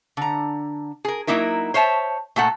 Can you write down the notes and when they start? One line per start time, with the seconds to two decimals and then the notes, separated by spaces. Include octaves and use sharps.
0.17 D3 A#5
1.05 G#4 A#4
1.27 F#3 A#3 D#4 E4 A#4
1.74 C5 C#5 E5 A5
2.36 A#2 A3 A4 F#5